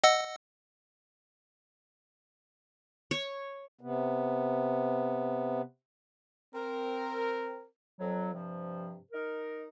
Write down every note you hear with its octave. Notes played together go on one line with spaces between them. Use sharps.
D#5 F#5 E6
C#5
C3 B3
C4 A#4
F2 F#3
G2 C3 F3
D#4 A#4